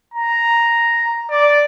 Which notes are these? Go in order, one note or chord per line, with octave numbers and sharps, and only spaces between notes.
A#5
D5